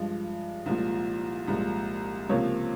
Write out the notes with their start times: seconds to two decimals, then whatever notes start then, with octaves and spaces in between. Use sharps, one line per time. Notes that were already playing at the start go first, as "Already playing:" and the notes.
Already playing: G2 F3 G#3
0.66 C2 A#2 F3 G#3
1.47 C2 A#2 F3 G#3
2.29 C#2 C3 F3 A#3 C#5